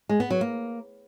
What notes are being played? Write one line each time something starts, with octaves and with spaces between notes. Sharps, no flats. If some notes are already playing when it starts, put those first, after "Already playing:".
G#3
B3
F#3
A#3